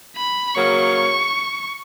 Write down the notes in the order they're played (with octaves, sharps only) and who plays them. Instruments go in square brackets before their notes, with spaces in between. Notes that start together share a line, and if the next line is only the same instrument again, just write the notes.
[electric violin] B5
[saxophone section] C#3 F#3 A#3 [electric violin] C#6